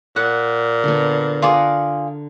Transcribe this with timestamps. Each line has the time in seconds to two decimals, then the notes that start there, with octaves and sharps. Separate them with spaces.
0.16 A#2 F#5
0.84 D3 B3
1.42 F4 G#4 A#4 D5 F#5